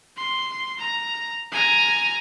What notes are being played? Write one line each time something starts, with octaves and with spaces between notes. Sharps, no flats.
C6
A#5
G#5 A#5